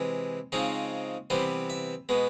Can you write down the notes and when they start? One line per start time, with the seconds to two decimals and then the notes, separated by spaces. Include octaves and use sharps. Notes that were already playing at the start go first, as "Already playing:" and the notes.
Already playing: C3 E3 G#3
0.52 C#3 F3 G#3 C4 D#4
1.30 C3 E3 G3 B3 C5
1.70 E5
2.09 B2 G#3 B3